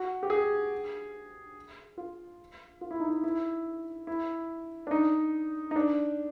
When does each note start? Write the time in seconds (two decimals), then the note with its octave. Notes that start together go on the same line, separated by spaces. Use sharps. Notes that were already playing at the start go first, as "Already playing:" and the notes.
Already playing: F#4
0.23 G4
0.30 G#4
1.98 F4
2.81 F4
2.91 E4
3.00 D#4
3.09 E4
3.24 E4
4.07 E4
4.87 D4
4.91 D#4
5.71 D#4
5.76 D4